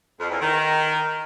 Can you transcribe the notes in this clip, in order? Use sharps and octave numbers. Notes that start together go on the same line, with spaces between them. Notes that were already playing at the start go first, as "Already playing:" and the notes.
F2
E2
D#3